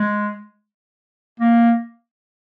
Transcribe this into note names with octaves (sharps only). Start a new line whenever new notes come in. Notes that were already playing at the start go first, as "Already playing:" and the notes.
Already playing: G#3
A#3